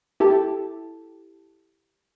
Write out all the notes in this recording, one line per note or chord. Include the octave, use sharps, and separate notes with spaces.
E4 G4 A4 A5